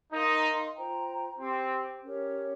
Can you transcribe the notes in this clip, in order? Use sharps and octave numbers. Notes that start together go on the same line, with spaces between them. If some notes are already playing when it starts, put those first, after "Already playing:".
D#4 A#4 F5 C6
F4 C5 G5 A#5
C4 G4 C5 G5
C#4 G4 A#4 C#5